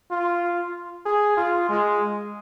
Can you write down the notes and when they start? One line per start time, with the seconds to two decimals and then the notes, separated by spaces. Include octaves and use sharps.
0.11 F4
1.06 G#4
1.37 F4
1.69 G#3